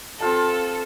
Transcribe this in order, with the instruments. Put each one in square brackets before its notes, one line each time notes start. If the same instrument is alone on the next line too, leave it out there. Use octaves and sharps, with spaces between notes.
[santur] C4 F4 A5 [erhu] A4